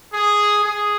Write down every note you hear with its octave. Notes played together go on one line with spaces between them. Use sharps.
G#4
G#4